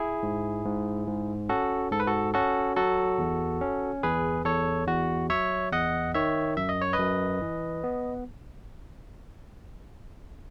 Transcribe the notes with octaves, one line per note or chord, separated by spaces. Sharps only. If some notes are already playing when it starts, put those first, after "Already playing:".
Already playing: E4 G#4
G#2
G#2
G#2
C#4 F#4 A4
G#2 A4
B4
F#4 A4
C#4 F#4 A4
F#3 F#4 A4
E2
C#4
E2 G#4 B4
E2 A4 C#5
E2 F#4
F#3 C#5 E5
E2 D#5 F#5
D#3 C#5 E5
F#2 E5
D#5
C#5
B4 D#5
F#2
E3
B3